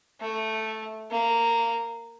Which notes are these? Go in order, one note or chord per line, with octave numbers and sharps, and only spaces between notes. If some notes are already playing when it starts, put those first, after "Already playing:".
A3
A#3